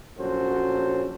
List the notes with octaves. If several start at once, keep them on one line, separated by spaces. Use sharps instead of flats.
A#1 F#3 C#4 F#4 A4 C5